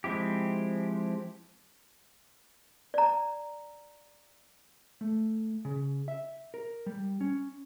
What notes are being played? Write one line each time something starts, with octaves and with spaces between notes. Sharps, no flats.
F3 G#3 C4 E4 G4
D5 A#5
A3
C#3
E5
A#4
G3
C#4